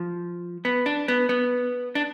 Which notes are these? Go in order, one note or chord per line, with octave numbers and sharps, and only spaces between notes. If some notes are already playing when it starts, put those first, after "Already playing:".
Already playing: F3
B3
D4
B3
B3
D4